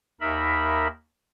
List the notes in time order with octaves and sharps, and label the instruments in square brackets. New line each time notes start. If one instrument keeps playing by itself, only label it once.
[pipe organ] D#2 D#4 A#4 E5 B5